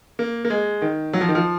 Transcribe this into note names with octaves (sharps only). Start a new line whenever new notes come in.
A#3
A#3
G#3
D#3
F#3
F3
D#3
F3